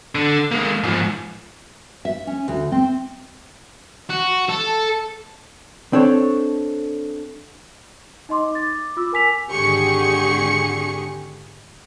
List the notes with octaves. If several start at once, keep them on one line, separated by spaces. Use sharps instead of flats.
D3
G#3 A#3
G#2 F3
E5
C#4
D2
C4
F#4
A4
C4 D4 A4 C#5
D#4 D#5 C6 D6
D6 A6
F4 D6 E6
A#4 G#5 B6 F7
G#1 D3 G4 G#4 C#6 C#7